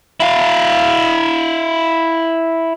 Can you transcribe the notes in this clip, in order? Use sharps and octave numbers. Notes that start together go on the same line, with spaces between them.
E4 F5